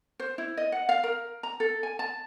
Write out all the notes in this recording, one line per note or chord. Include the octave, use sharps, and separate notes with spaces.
C5
E4
D#5
F#5
F5
A#4
A#5
A4
G#5
A5